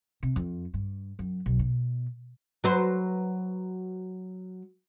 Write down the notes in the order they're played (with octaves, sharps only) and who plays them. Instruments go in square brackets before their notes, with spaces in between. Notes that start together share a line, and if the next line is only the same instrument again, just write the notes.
[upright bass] C3
F2
G2
F#2
B1
B2
[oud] F#3 B4 C5